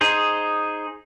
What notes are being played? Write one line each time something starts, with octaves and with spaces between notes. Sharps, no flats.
D#4 G#4 C5